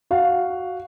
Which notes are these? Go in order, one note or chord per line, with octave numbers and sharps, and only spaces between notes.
F#4 F5 F#5